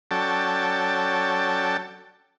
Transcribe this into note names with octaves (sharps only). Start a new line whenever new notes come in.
F#3 C#4 A4 D5 G5 A5